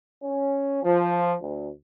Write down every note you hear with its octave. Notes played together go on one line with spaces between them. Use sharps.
C#4
F3
D2